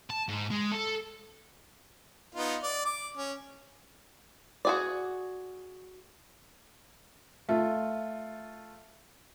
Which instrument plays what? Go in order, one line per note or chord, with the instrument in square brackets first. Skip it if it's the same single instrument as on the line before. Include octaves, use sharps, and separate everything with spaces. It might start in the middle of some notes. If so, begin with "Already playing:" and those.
[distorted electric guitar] A5
G#2
G#3
A4
[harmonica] B3 D#4 F4
D5
D6
C#4
[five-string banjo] F#4 G#4 D5
[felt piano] A3 F4